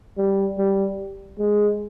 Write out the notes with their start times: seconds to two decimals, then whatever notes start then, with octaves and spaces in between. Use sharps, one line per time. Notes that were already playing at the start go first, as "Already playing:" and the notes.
0.18 G3
0.58 G3
1.39 G#3